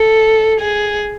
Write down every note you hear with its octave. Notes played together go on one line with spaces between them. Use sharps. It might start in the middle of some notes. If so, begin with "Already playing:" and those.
Already playing: A4
G#4